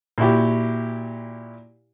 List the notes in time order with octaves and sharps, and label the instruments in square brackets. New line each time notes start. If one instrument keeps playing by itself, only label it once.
[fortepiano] A#2 E4 F#4 G4